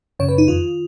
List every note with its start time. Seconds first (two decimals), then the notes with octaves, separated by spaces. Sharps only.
0.19 F#2 C#3 C#5
0.29 B4
0.38 D#4
0.48 F2 D#3 F4